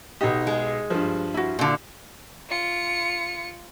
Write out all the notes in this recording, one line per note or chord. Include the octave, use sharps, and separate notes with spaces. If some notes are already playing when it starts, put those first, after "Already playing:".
B1 D#4 G4 D#5
G#3
G2 F3
E4 F#4
A#2 D3
F4 C#7